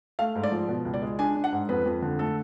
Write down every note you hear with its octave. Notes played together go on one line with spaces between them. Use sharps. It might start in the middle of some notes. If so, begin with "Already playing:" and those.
A3 F5
G#2
D5
F3
B2
C#2
D5
G#3
D4 G#5
D4
F#5
G#2
F2 B4
F2
D3
A3 A4